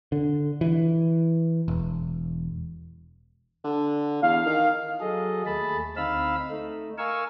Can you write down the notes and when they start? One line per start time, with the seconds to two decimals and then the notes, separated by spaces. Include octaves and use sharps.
0.12 D3
0.61 E3
1.68 E1
3.64 D3
4.22 E2 F5
4.46 D#3
5.00 F#3 G#4 A4 D#5
5.46 D#2 A3 G#4 A5 B5
5.96 D2 C4 D#4 F5 B5 E6
6.50 A3 D#4
6.98 A#4 F5 G#5 C#6 E6